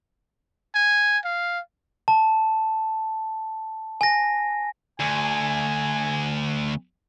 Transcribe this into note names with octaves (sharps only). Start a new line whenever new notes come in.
G#5
F5
A5
G#5 A#6
D2 G#5